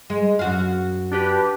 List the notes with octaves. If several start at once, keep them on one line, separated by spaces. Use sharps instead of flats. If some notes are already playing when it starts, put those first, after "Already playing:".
G#3
F#2 F#4 F5
D4 G4 B4